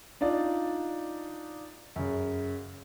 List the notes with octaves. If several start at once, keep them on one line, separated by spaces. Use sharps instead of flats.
D4 D#4 F4 D5
F#2 C#3